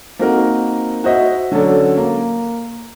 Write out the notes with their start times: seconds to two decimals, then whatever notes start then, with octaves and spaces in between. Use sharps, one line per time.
0.19 A#3 C4 D#4 F#4 A#4
1.04 F#4 C5 D#5 E5
1.52 D3 F#3 C#4 A4 D5
1.97 A#3